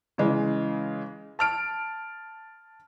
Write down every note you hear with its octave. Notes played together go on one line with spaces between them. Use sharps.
C#3 E3 G#3
A5 F6 D7